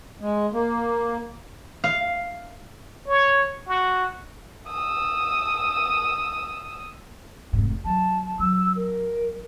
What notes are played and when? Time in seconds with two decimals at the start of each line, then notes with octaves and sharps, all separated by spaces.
0.21 G#3
0.53 A#3
1.84 F5
3.07 C#5
3.68 F#4
4.68 D#6 E6
7.53 F1 G#2
7.85 F#3 A5
8.39 F#3 E6
8.76 A#4